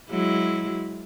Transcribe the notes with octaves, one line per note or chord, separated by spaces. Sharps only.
F#3 G#3 E4